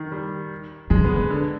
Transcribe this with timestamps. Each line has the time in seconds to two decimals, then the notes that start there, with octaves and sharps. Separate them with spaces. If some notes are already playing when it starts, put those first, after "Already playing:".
Already playing: D#3
0.12 G3
0.90 D3 G#3
1.04 B3
1.16 B3
1.30 D3